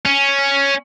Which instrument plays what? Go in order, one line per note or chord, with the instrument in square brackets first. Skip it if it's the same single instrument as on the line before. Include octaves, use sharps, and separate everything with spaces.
[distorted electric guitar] C#4